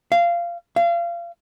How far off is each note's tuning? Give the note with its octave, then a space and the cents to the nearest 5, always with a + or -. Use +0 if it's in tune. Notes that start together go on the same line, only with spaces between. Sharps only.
F5 -20
F5 -30